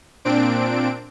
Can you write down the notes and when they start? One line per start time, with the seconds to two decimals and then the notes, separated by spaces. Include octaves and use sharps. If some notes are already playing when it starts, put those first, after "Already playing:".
0.25 A#2 C4 D4 D7